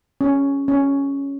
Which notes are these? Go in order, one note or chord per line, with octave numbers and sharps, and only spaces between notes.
C#4
C#4